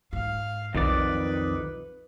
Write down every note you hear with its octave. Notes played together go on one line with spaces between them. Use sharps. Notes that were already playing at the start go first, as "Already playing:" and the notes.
G#2 F5
B1 F2 D#3 B4 D5